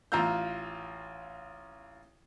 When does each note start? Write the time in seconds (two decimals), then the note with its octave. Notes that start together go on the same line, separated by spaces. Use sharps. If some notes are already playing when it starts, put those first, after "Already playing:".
0.12 A1 F4 F5 A#5 E6 G6